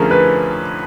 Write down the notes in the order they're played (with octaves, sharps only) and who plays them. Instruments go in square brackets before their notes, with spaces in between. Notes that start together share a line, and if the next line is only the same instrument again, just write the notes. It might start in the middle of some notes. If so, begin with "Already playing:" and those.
Already playing: [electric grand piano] F2 D3 F3 A3 C#4 [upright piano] G#4 A#4
[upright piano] B4